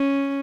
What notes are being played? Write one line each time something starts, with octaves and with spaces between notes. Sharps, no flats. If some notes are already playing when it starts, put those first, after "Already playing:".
Already playing: C#4